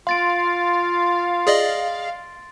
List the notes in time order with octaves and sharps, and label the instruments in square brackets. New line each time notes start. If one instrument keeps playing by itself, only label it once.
[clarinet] F4 [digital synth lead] F5 [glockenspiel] C6 A6 D7
[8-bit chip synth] G#4 D5 D#5